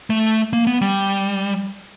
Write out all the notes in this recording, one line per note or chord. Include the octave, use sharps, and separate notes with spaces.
A3
A#3
B3
G3